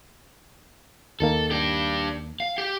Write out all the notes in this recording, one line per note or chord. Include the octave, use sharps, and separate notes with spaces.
D#2 D#3 A#3 A4
D4 G4
F5
G4 G5